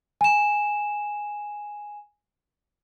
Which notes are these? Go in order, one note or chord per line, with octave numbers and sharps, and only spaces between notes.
G#5 E7